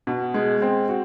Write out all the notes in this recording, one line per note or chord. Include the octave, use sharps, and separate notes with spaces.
B2
G#3
C4
F#4